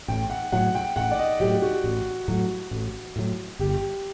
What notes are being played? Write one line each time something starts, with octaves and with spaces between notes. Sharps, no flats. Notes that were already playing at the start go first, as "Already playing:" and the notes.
A1 G5
F#5
A2 F#3 F#5
G5
A1 F#5
D5
D#5
A2 F#3 G4
F#4
A1
A2 F#3
A1
A2 F#3
G1 G4